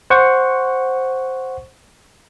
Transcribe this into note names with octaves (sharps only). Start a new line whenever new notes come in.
C5 F#5 C#6